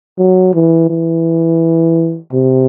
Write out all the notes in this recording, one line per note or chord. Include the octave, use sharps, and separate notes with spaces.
F#3
E3
E3
C3